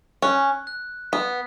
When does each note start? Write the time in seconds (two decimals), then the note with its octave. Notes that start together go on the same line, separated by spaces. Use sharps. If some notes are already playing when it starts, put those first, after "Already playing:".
0.22 C#4 F#6
0.67 F#6
1.12 B3 B6